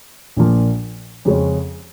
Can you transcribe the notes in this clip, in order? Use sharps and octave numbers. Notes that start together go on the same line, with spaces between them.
A#1 A#2 F3 A#3
F2 C#3 G#3 C#4